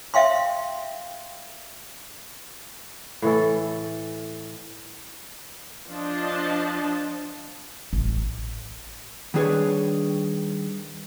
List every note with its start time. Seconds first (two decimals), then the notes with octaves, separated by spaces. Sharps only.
0.14 E5 F5 G5 C6
3.22 A2 E3 A4
5.90 F3 D4 F4 D#5 A5
7.93 A1
9.34 D#3 G3 D4 G#4 B4 C#5